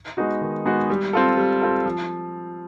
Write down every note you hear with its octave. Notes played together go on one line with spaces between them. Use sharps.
G#3 B3 D#4 F#4
D#3
G#3 B3 D#4 F#4
G3
C4 F4 A4
G3
C4 F4 A4
F3